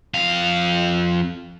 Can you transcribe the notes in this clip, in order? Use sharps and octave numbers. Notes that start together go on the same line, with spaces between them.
F2 F5